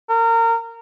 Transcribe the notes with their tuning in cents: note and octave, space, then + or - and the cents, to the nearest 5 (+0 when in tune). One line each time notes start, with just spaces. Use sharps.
A#4 -25